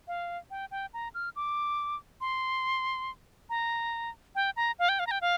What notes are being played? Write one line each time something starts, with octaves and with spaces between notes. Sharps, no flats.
F5
G5
G5
A#5
F6
D6
C6
A#5
G5
A#5
F5
G5
F5
A#5
G5
F5